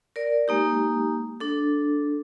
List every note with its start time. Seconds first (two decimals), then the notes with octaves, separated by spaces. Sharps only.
0.16 A#4 D5
0.48 G#3 A#3 D#4 G4
1.40 D4 A4